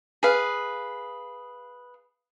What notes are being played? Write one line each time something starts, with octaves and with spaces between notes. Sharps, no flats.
G#4 B4 F5